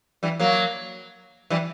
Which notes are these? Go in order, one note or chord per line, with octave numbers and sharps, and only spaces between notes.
E3 G3
F#3 A#3
E3 G3